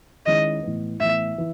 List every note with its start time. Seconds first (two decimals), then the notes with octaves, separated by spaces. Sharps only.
0.26 D#3 G#3 C#4 E4 D#5
0.63 A2 E3 B3
1.00 A2 E3 B3 E5
1.38 E3